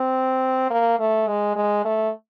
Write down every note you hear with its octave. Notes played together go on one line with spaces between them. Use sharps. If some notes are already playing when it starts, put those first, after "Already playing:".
Already playing: C4
A#3
A3
G#3
G#3
A3